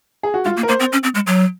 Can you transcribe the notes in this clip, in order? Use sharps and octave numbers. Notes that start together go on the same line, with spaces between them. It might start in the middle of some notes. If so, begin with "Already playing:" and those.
G#4
F#4
G#3 F4
A#3
A#4
A#3 C5
C4
C#4
C4
G#3
F#3